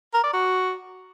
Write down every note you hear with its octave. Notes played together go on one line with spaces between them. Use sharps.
A#4
D5
F#4